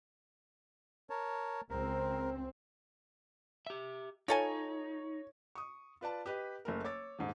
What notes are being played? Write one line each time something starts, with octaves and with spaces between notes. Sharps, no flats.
A#4 C#5 A5
C#2 C4 A#4
G4 E5
D#4 F4 A4 C#5 G#5
C#6 D#6
F4 B4 D5 A5
G4 B4 D#5
F#1 A3 A#4
C#5 D6 E6 A6
D#1 G#2